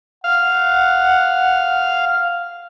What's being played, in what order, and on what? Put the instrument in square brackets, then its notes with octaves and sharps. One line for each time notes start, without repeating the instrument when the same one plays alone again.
[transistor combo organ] F5 [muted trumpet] F#5